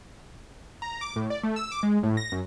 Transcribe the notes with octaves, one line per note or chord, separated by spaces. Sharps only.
A#5
D6
A2
D5
A3
E6
D6
G#3
A2
A#6
F#2